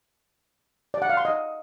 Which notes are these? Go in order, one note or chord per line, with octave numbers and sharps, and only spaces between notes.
D5
F#5
F5
C6
D#5